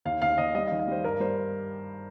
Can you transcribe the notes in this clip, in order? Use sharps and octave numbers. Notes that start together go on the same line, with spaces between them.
D#2 F5
D#2 F5
D#2 D#5
G3 D#5
F5
D#3
F5
G3 C5
G2 A#4
G3 C5